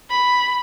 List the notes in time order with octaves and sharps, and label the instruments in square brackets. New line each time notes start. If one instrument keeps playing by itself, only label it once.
[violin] B5